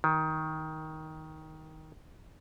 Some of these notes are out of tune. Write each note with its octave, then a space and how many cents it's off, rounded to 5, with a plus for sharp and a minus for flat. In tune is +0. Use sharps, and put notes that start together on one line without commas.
D#3 +10